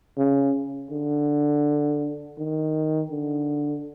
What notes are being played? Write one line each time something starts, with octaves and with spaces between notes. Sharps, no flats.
C#3
D3
D#3
D3